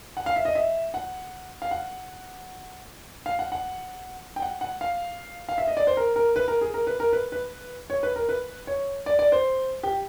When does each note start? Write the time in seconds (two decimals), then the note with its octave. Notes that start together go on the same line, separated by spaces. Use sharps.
0.17 F#5
0.26 F5
0.36 E5
0.45 D#5
0.55 E5
0.94 F#5
1.62 F5
1.71 F#5
3.26 F5
3.39 F#5
3.52 F#5
4.36 G5
4.42 F#5
4.61 F#5
4.81 F5
5.49 F5
5.58 E5
5.67 D#5
5.77 D5
5.87 C5
5.97 A#4
6.16 A#4
6.36 B4
6.48 A#4
6.61 G#4
6.74 A#4
6.87 B4
7.00 A#4
7.13 B4
7.32 B4
7.90 C#5
8.03 B4
8.16 A#4
8.29 B4
8.67 C#5
9.06 D5
9.19 D5
9.32 C5
9.83 G4